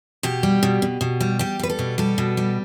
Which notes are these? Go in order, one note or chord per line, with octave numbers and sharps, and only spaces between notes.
B2 G4
G3
B2
B2
B2
G3
G3 G4
G3 B4
A4
B2
G3 A4
B2
G3